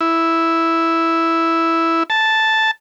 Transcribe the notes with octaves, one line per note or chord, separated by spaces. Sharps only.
E4
A5